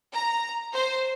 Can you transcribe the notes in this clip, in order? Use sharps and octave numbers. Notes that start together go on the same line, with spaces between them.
A#5
C5